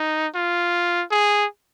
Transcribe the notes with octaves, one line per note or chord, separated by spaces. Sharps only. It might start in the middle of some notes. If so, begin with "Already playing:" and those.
Already playing: D#4
F4
G#4